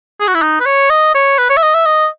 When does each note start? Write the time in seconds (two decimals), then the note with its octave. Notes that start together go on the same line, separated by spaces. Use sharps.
0.20 G#4
0.27 F#4
0.34 E4
0.42 D#4
0.60 B4
0.66 C#5
0.90 D#5
1.14 C#5
1.38 B4
1.50 C#5
1.57 E5
1.63 D#5
1.74 E5
1.86 D#5